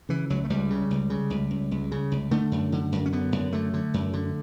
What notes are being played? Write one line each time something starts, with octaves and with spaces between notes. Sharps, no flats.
C#3 E3
C#2 F#3
A3
C#2 G3
C#3
C#2
C#3
C#2
C#2
C#2
C#3
C#2
D3 A3
F#2
D3
F#2
C#4
D3 B3
F#2
D3 A3
D3
F#2
D3